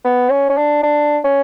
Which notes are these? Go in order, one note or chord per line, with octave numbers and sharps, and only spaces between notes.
B3
C#4
C#4
D4
D4
C#4